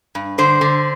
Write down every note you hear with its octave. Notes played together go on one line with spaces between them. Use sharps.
G2
D3 C5
D3